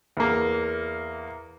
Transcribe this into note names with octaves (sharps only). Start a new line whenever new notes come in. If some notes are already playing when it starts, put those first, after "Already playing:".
E2 A#3